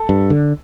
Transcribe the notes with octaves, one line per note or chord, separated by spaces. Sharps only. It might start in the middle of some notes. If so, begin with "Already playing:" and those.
Already playing: A4
G2
D3